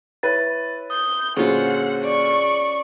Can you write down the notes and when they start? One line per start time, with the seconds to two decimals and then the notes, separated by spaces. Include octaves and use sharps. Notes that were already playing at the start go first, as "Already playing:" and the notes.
0.23 E4 B4 C#5 A6
0.90 D#6 G6
1.37 A#2 D3 F#3 C#4 F4 G#4 C5 F#5
2.04 D5 C#6